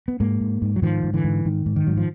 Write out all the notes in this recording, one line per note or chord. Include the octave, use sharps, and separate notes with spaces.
B3
G#2 G#3 A#3
G#2
G#2
F#3
G#2 D#3 F3
G#2
D3 E3
G#2
G#2 D#3
G#2
D#3
G#2 F#3
F3